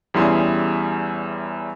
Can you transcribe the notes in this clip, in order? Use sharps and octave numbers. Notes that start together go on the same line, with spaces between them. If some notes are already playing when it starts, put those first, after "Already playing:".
E2 G3 C#4 E4 G#4 C6